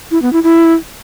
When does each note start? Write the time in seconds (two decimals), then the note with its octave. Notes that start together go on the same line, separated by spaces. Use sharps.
0.11 E4
0.22 B3
0.33 E4
0.44 E4